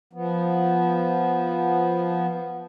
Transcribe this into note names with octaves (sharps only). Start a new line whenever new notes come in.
F3 B3